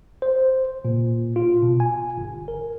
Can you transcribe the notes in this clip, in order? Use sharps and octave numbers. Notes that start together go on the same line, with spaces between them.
C5
A#2
F4
B2
G#5
G1
A#4